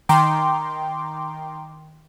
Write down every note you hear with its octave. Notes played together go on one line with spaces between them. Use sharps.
D#3 G5 A#5 C6 D6